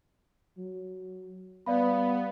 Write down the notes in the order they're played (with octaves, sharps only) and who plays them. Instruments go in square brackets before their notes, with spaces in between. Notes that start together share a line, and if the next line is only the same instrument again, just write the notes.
[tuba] F#3
[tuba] G3 [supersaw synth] B3 [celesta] D5 F5 B5